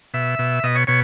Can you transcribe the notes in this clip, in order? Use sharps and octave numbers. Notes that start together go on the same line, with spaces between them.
B2 E5
B2
B2 D#5
C#5
B2 C#5